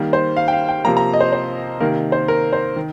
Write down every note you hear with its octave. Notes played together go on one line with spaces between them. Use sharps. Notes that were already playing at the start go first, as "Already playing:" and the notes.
Already playing: D#3 G3 A#3
C5
F5
G5
F5
G5
C3 F3 A#3 A#5
A#5
D#5
C5
C5
C3 D#3 A#3 A#4
C5
A#4
C5
D#3